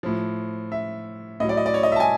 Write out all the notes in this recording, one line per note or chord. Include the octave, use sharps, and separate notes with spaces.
A2 F3
E5
A2 F#3 D#5
D5
D#5
D5
C#5
D#5
E5
A5
G#5